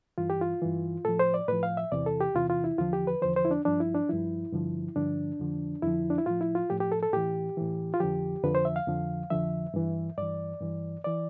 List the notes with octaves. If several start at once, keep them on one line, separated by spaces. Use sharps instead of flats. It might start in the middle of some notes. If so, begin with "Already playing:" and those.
G2 E3 F4
G4
F4
G2 E3
A2 F3 A4
C5
D5
A2 F3 B4
F5
E5
E2 C3 E3 D5
A4
G4
E2 C3 E3 F4
F4
E4
E2 D3 F3 F4
G4
B4
E2 D3 F3 C5
C5
E4
D4
G2 F3 D4
E4
D4
G2 F3 E4
G2 D3 F3
G2 D3 F3 D4
F2 D3 F3
F2 D3 F3 E4
D4
E4
A2 F3 F4
E4
F4
A2 F3 G4
G4
A4
A4
A2 E3 G4
A2 E3
F4
F2 D3 F3 G4
F2 D3 F3 B4
C5
E5
F5
F2 D3 F3
F2 D3 F3 E5
G2 E3
G2 E3 D5
G2 E3
E3 D5